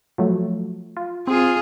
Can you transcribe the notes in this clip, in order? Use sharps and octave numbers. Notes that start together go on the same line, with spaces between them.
F3 F#3 A3
F4
C4 F4 G#4